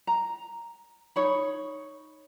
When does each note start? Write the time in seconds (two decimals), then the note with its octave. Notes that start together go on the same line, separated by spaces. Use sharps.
0.07 A#5
1.16 D#4 C#5 B5